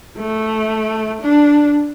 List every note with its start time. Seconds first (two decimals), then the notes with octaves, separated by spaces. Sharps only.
0.18 A3
1.22 D4